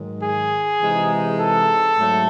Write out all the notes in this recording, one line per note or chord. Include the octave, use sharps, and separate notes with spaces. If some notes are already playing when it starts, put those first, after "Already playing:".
Already playing: G#2 D#3 F#3
G#4
C3 E3 G#3 D#4
A4
G#2 F#3 A3